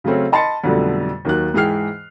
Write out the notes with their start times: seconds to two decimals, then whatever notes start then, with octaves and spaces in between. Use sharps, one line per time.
0.04 C#3 F#3 A3 C4 C#4
0.32 D#5 A5 B5 C6 A6 C#7
0.64 F2 B2 D3 F#3 G3 A3
1.25 D#2 D#3 F#3 F#6
1.54 G#2 E3 G#4 G5 F6 C7